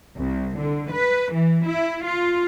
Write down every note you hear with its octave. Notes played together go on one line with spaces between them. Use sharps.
C2
D3
B4
E3
E4
F4